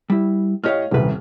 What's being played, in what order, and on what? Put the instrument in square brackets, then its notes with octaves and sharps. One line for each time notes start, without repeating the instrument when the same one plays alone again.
[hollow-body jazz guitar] G3 E4
[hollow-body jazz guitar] A2 G4 F5 [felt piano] C#5 D#5 F6
[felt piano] D#1 C2 [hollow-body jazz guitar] F2 B4